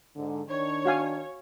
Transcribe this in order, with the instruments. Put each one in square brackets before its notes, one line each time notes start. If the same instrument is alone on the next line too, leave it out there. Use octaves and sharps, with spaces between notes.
[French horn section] G#2 D3
[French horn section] D#3 D4 [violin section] C#5
[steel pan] F#4 F5 G#5